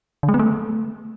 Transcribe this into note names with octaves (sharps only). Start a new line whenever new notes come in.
D3
G#3
B3
A3